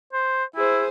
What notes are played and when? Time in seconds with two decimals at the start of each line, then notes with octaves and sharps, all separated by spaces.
0.13 C5
0.56 E4 G#4 C5